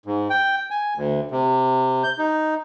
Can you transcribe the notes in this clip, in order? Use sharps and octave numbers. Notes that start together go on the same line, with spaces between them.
G#2
G5
G#5
D2
C3
G6
D#4